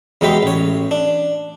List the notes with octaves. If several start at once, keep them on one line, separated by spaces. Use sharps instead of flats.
E2 F#3 G#3 G4 B4
A1 C#5
D4